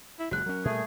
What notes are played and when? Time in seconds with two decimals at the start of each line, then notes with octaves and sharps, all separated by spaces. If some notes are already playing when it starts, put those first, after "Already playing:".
0.19 E4
0.31 F#1 E2 G#3 F#4 F#6
0.46 F#3 C#4 A#4
0.65 A#2 G3 A3 G#4